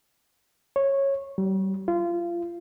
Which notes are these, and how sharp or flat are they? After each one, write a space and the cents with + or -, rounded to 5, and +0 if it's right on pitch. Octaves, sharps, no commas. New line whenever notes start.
C#5 -15
G3 -40
F4 -25